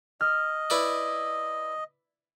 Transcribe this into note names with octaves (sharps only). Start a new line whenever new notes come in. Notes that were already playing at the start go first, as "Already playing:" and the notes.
D#5 F6
E4 B4 D5